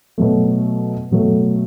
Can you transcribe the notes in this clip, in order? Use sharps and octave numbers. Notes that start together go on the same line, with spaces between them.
B2 F#3 A3
B2 F#3 A3